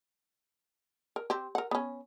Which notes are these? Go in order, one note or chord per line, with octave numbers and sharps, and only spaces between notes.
A#4
C4 G4
A#4 F#5
B3 C#4